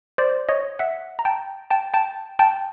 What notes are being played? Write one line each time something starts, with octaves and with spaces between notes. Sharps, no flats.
C5 D5
C#5 D#5
E5 F#5
A#5
G5 A5
G5 A5
G5 A5
G5 A5